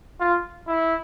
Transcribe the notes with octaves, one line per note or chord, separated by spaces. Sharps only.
F4
E4